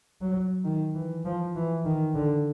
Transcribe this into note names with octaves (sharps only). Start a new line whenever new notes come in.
F#3
D#3
E3
F3
E3
D#3
D3